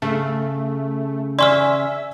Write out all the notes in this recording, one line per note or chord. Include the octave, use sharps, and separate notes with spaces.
C#3 A3
D5 E5 G#5 C6 C#6 F6